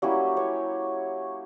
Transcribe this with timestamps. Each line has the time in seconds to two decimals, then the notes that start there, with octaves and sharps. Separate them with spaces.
0.02 F#3 G3 A#3 C#4 E4 G4
0.37 C#4 C#5